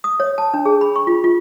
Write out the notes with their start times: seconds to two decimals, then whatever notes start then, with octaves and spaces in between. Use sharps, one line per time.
0.04 D#6
0.20 C#5
0.38 A5
0.54 D4
0.65 G#4
0.81 B5
0.96 C#6
1.07 F4
1.24 F4